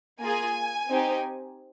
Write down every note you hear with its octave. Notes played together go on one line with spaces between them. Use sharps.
A#3 F4 G#4 G#5
C4 D#4 G4